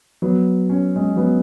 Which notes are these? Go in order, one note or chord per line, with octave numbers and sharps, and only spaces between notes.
F#3 B3
C#4
G#3 C#4
F#3 B3